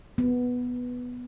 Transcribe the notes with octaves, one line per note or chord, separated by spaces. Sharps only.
B3